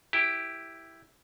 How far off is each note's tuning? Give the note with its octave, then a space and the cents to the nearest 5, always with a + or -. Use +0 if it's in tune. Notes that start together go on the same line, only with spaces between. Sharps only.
E4 +0 G4 +0 A#4 -10